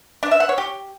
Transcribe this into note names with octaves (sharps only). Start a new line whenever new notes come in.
D4
E5
F#5
C#5
G4